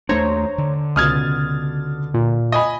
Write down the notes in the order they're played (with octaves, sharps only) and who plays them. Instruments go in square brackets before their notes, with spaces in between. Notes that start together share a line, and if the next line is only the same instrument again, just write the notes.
[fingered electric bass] D#2 A3 D4 [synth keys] C5 C#5 A#5
[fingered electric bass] D3
[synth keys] C#2 B2 A6 [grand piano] D#6 F6 G#6
[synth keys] A#2
[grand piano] D#5 G#5 B5